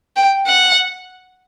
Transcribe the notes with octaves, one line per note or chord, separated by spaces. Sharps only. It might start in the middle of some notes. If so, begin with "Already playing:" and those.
G5
F#5